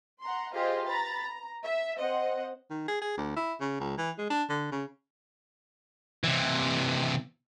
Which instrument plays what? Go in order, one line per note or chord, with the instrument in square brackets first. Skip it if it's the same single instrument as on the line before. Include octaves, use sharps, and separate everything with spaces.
[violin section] F#5 A#5 C6
F4 G4 G#4 C5 D#5 F5
B4 A#5 B5 A6
A#5
E5
C4 C5 D#5 F#5
[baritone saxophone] D#3
G#4
G#4
D2
E4
C#3
C#2
E3
G#3
D4
D3
C#3
[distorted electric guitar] C3 E3